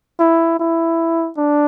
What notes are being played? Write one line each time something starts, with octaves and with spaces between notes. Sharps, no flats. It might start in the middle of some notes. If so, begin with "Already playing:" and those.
E4
E4
D4